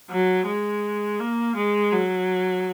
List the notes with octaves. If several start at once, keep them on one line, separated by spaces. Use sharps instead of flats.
F#3
G#3
A#3
G#3
F#3